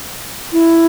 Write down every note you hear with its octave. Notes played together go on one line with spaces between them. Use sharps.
E4